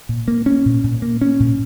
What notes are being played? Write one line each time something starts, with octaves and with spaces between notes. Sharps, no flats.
A#2
A#3
C#4
A#2
A#2
A#3
C#4
A#2